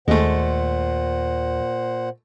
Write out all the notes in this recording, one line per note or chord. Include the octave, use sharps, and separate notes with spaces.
D#2 A#2 G#3 A3 C5 F#5